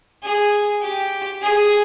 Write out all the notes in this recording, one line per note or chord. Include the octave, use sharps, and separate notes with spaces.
G#4
G4
G#4